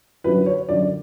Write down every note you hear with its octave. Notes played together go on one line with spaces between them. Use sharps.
F#2 D3 F#3 B4
C#5
F#2 D3 F#3 D5